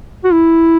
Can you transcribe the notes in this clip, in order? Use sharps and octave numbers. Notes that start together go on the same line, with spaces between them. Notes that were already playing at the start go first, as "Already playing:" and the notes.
F#4
E4